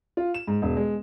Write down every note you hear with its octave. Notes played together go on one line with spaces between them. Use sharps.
F4
E7
G#2
E1
G#3